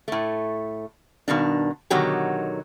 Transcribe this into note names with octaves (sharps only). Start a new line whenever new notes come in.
A2 A3
G2 B2 D#3 D4
B2 D3 D#3 F#3 D#4 G4